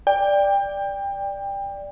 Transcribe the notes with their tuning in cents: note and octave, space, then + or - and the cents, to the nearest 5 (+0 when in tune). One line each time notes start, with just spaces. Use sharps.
D5 +0 G5 +25